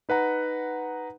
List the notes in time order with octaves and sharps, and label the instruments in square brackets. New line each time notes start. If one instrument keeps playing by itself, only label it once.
[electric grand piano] D#4 B4 F#5 A#5